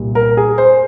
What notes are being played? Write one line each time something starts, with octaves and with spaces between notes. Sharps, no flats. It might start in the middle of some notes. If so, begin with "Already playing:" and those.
Already playing: C2 A#2 G3
A#4
G#4
C5